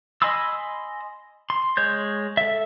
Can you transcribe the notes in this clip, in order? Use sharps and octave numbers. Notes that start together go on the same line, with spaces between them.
D#5 G#5 B5 C6 E6
C6
G#3 C#5 G6
A4 E5